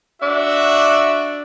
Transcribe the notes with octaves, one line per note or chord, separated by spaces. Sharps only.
D4 F#4 E5